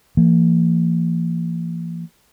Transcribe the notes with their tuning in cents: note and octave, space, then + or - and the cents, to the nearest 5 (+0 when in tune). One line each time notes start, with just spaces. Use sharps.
E3 +40 A#3 -30